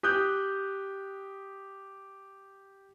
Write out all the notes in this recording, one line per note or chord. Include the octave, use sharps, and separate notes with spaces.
G4 D#6 F#6 G6